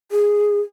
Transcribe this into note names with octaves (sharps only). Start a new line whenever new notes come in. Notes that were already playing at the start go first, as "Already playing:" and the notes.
G#4